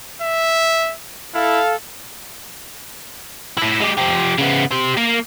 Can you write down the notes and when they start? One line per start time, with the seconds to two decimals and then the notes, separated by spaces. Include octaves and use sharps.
0.22 E5
1.34 E4 A4 F5
3.57 A2 E4
3.80 G#3 G4
3.97 F3 G4
4.39 C#3 B3
4.72 G4 C5
4.97 A#3